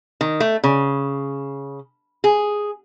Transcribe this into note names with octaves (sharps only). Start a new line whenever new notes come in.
D#3
A3
C#3
G#4